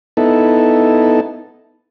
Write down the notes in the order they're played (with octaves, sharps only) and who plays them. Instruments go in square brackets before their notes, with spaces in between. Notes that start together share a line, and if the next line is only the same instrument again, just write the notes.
[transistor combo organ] B3 D#4 E4 A4